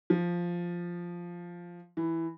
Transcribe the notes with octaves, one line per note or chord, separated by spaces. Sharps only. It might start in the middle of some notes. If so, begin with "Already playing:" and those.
F3
E3